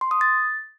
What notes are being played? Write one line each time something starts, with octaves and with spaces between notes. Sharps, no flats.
C6
D#6
A6